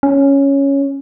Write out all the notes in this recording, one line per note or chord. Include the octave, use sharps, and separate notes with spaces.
C#4